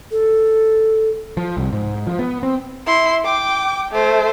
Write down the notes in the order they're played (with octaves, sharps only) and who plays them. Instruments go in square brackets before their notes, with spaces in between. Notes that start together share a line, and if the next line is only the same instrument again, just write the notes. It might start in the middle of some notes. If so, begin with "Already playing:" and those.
[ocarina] A4
[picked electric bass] F3
C2
G#2
F3
B3
C4
[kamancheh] E4 C6
G5 D6
A3 C5